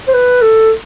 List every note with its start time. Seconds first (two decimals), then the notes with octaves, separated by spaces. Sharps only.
0.08 C5
0.14 B4
0.42 A4